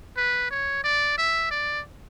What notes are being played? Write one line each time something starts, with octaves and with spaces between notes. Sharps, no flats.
B4
C#5
D5
E5
D5